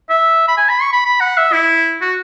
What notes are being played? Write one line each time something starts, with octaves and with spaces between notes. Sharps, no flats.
E5
B5
G#5
B5
C#6
B5
B5
F#5
E5
E4
F#4